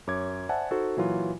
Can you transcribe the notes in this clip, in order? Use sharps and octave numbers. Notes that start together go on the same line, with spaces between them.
F#2 C#5 D6 G#6
C5 D5 E5 F#5 G#5 A5
D#4 F#4 A4 C5
A#2 E3 F#3 F4